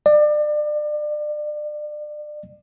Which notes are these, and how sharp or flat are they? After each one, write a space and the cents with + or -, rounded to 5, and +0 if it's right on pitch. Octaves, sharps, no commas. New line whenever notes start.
D5 +30